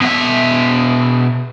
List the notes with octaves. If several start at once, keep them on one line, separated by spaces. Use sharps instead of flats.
B2 E5